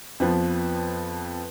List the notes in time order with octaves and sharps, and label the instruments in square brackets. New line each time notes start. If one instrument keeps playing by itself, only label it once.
[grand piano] F2 F3 B3 B4